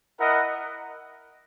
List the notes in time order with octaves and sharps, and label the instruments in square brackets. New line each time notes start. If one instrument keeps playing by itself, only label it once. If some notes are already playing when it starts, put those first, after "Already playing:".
[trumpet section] E4 A#4 D#5 F#5